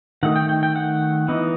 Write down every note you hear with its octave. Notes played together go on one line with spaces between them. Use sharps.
D#3 A3 D#4 F#5
G5
G5
G5
F#5
E3 B3 D#4